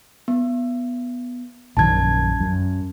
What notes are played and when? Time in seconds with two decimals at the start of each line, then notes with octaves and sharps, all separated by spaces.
0.28 B3
1.77 A#1 F#2 D#3 A5 G#6
2.40 F#2